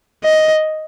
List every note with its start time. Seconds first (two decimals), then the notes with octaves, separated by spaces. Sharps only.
0.24 D#5